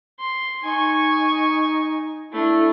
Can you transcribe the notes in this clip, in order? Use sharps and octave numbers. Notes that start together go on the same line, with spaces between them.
C6
D#4 G#5 C#6
A3 D4 E4